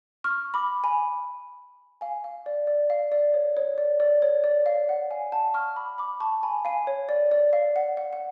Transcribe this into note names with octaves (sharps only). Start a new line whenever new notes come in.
C#6 F6
B5 D6
G#5 B5
F5 G#5
F5
D5
D5
F5
D5
C#5
C#5
D5
D5
C#5
D5
F5
F#5
F5 G#5
F#5 A5
C#6 F6
B5 D6
B5 D6
A5 C#6
G#5 B5
F5 G#5
C#5
D5
D5
F5
F#5
F#5
F#5